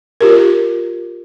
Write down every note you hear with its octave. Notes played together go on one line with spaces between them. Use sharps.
F4 G4 A#4